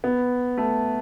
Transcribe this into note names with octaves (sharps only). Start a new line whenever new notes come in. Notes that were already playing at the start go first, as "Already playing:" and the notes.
B3
A3